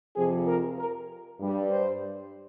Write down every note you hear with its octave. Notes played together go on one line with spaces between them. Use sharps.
F2 C3 F3 G#4
A#4
A#4
G2 G3
C5